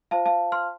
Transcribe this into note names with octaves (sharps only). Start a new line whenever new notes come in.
F4 C5 F5 A5
F5 A5
C6 F6